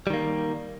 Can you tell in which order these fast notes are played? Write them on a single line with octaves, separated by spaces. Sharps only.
G3 D#3 A#3